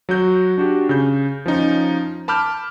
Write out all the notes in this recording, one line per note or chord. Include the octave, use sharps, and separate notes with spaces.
F#3 F#4 G6
D4 F#4 G4
C#3 G6
F3 C#4 D#4
A5 B5 D6 F6 G6